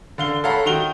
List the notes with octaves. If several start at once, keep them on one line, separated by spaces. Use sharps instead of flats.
D3 F5 G7
A4 C#5 F5 F#5 A#5 B5
D#3 F#4 F7 G7